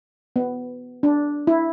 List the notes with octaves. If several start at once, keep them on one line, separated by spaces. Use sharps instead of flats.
B3
D4
E4